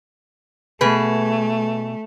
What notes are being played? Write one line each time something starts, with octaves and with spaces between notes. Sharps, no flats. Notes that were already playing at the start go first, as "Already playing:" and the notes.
B2 A3 G#4 B4